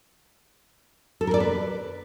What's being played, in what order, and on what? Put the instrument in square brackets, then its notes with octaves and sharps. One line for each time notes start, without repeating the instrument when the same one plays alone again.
[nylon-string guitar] A4
A#4
D5
B4